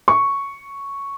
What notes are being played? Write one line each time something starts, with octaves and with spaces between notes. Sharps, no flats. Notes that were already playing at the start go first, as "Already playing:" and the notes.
C#6